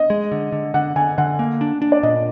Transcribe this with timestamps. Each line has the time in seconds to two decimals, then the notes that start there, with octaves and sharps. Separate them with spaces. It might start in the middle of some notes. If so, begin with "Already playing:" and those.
Already playing: D#5
0.10 G#3
0.32 D3
0.52 D3
0.74 D3 F#5
0.96 D3 G#5
1.18 D3 F#5
1.39 A#3
1.61 D4
1.82 D4
1.92 D5
2.03 A#2 D#5